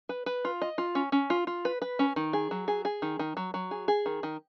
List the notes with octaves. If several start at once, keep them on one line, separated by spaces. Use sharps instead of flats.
B4
B4
F4
D#5
F4
C#4
C#4
F4
F4
B4
B4
C#4
D#3
G#4
F#3
G#4
G#4
D#3
D#3
F#3
F#3
G#4
G#4
D#3
D#3